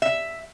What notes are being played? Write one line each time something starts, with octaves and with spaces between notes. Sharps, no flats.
E5